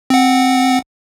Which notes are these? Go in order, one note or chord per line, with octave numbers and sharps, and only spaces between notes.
C4 F#5